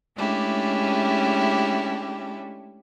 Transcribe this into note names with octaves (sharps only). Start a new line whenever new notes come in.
G#3 A3 C#4 D4 E4 G4